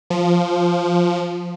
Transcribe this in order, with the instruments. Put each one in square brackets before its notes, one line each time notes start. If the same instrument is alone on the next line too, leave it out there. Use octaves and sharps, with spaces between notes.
[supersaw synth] F3